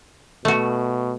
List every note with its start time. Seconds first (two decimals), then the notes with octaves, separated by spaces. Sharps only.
0.45 B2 A3 F#4